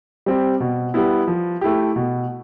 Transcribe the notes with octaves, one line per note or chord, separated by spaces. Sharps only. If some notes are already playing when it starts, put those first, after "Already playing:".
G3 C4 G4
B2
G3 B3 E4
F3
A3 E4 G4
B2